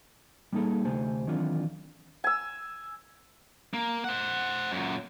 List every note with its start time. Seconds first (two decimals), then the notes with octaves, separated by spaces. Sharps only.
0.52 G3 A#3 D#4 G#4 A4
0.85 D2 C3 A3 G4 C5 G#5
1.27 D#3 E3 F#3 C4 D4 F4
2.24 G#5 E6
3.74 A#3
4.04 C5 F#5
4.72 F#2 A#2